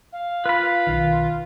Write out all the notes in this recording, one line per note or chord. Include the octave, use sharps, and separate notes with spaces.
F5
F4 B4 B5
B1 D#3